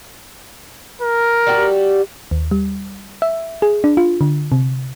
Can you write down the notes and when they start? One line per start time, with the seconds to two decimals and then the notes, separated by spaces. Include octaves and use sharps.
1.02 A#4
1.47 G3 F#4 G4
2.31 D#2
2.51 G3
3.22 E5
3.62 G#4
3.84 D4
3.97 F4
4.21 D3
4.52 C3